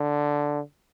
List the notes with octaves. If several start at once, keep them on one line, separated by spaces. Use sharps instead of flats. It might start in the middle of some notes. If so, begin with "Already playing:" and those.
Already playing: D3